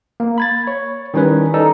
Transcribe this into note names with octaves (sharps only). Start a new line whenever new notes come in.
A#3
B5 G#6 A6
C#5
D#3 G3 C#4 E4 B4 C#5
D#4 A4 D5